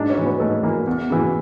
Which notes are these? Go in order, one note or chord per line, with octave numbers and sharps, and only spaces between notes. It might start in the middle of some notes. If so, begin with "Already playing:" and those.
Already playing: G#2 D4
C#4
E3
B3
G#2 A3
E3 A#3
E2
C#3 E3